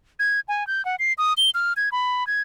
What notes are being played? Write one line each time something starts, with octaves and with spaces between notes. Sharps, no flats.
G#6
G#5
G6
F#5
C7
D#6
G7
F6
G#6
B5
G#6